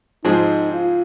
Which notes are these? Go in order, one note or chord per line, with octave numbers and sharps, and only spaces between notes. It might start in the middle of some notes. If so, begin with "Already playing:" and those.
G#2 F3 C4 D#4 G#4
F4